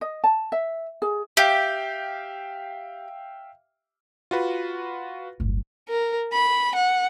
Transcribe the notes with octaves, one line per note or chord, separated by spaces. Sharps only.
D#5
A5
E5
G#4
G4 E5 F5 G5
F4 F#4 B4
D1 G1
A#4
B5
F#5